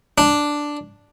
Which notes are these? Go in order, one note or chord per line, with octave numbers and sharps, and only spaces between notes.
D4